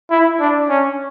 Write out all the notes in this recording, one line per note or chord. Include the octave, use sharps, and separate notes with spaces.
E4
D4
C#4